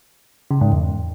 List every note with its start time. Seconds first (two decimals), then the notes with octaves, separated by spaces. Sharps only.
0.51 C#3
0.61 G#2
0.72 E2